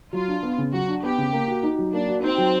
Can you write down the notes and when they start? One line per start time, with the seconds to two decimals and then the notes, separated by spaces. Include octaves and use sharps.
0.13 F#3 F4
0.28 D4
0.43 B3
0.58 C#3
0.73 F#3 F#4
0.88 D4
1.03 B3 G4
1.18 C#3
1.33 A#3
1.48 F#4
1.63 D#4
1.78 F#3
1.93 A#3 D4
2.08 F#4
2.23 C4 D#4
2.38 F#3